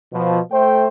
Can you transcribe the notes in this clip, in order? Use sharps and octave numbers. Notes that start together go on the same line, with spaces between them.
B2 F3
A3 C5 G5